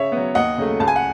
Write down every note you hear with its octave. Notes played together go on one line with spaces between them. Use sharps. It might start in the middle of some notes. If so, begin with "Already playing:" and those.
Already playing: C#3 C#5 E5
F#3 B3
D#2 D#5 F#5
C#3 F#3 A3
C#2 A5
G#5
F#5